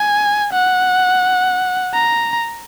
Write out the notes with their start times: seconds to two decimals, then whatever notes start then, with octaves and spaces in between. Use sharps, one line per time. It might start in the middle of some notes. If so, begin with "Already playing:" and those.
Already playing: G#5
0.53 F#5
1.94 A#5